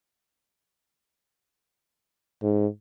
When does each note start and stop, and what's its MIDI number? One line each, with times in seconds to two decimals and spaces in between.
2.43 2.67 44